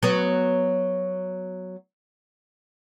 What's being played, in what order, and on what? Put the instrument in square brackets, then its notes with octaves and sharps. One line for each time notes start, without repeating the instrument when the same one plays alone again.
[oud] F#3 B3